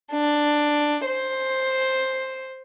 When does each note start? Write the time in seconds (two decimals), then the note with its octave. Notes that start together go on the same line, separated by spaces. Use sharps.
0.12 D4
1.06 C5